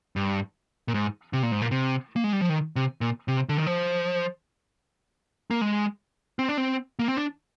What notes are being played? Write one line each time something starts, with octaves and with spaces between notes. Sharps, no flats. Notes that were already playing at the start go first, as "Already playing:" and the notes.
G2
A#2
G#2
C3
A#2
G#2
A#2
C3
A#3
G#3
G3
F3
D#3
C3
A#2
C3
D3
D#3
F3
A#3
G#3
C4
D4
C4
A#3
C4
D4